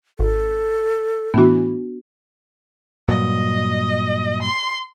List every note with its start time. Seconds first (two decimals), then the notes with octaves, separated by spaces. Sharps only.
0.19 G#1 A4
1.34 A2 E3 B3 D4 F#4
3.09 G2 A#2 F#3 D#5
4.41 C6